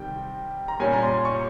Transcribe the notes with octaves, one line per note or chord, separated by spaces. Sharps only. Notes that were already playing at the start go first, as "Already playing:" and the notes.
Already playing: C3 D#3 G3 G5
A#5
A#2 G3 C#4 G#5
A#5
C6
C#6